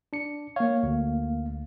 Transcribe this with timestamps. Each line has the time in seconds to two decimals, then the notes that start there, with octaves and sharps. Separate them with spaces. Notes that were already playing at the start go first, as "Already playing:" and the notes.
0.13 D4 C#7
0.56 A#3 C#5 F5
0.83 D2